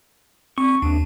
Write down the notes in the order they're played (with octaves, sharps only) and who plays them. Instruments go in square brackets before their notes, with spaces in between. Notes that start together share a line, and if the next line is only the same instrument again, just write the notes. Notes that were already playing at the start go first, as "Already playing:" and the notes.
[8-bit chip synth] C4 [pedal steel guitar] C#6
[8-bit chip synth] D#2 [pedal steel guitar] D4